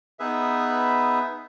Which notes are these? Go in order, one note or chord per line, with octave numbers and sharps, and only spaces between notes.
B3 D#4 G#4 B4 E5